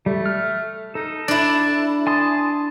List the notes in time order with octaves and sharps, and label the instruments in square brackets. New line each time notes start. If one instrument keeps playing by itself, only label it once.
[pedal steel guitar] G3 [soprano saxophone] A3
[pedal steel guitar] F6
[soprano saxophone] D#4 [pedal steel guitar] A4
[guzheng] D4 E4 [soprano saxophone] A5
[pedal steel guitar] G#5 C6 D#6 [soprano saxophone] A5